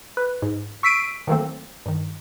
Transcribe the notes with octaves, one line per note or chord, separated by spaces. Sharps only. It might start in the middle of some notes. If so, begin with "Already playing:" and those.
B4
G#2
C#6 E6 B6 C7 D7 D#7
D#3 E3 F#3 A3 A#3 C4
G2 D#3